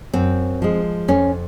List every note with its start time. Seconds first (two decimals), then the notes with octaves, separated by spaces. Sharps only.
0.13 F#2 C4
0.62 F3 G#3
1.08 F2 C#4